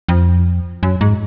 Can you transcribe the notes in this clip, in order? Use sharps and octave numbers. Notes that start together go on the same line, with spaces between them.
F2
F#2
G#2